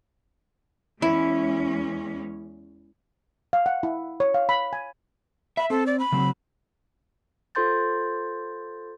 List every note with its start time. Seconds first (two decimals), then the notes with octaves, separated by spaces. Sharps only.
1.02 E2 G#3 C#4 E4
3.53 F5
3.66 F#5
3.83 E4
4.20 C#5
4.34 F5
4.49 B5
4.73 G#5
5.57 E5 B5
5.70 C4 A4
5.87 D5
5.99 B5
6.12 C#3 F#3 C4
7.55 F4 A4 C5 C6 G6 A6